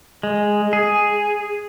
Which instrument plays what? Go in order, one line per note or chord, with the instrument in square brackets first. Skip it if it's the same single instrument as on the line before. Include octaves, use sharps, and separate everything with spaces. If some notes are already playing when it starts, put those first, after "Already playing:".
[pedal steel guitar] G#3
G#4